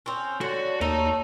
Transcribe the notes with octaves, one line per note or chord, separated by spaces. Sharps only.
C4 C#4
D3 F#4 C#5
D#2 A3 C#5 D#5 A#5